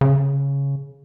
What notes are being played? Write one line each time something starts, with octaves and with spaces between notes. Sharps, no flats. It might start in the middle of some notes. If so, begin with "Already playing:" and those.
C#3